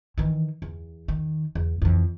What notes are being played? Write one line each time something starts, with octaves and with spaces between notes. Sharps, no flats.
D#3 E3
E2
D#3
E2
F2 E3